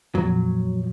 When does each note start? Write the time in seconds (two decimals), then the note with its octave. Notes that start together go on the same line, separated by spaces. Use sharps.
0.15 F2 A#2 F#3